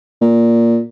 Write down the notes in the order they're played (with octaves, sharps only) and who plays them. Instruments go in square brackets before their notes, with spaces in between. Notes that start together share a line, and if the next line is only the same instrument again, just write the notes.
[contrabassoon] A#2